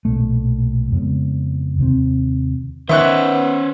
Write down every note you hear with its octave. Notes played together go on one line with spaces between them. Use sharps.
B1 F#2 A#2 A3
F2 C#3 G#3 B3
D#2 C3 C4
D#3 B3 C#4 C5 E5 C#6 F#6